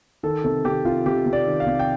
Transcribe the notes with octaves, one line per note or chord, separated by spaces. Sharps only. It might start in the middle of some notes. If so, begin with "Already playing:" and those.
D#3 A4
C3 A4
C3 G4
C3 F4
C3 G4
C3
D5
D#3
F5
C3
G5